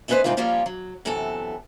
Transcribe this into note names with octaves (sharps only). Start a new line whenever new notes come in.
A3 C#4 D#4 F#4 B4 C5
G#2 C3 G3 D#4 F4
F3 G3 A#3 C#4 F4 C#5
F#3
F#2 C3 E3 B3 A4